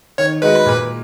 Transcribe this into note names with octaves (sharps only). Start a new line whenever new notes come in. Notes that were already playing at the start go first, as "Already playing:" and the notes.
D#3 C#5
G#3 D#4 F#4 B4
A#2